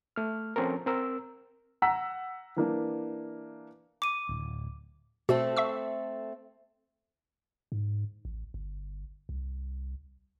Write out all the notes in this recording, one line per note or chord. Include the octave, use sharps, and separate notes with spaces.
A3 F6
F3 C4 C#4 A4 A#4
C4 A#4 E6
F#5 A#5 E6 B6
E3 A#3 D4
D6 D#7
D1
B2 A3 C4 F#4 A4
E5 C#6 E6
G#2
A1
G1
C2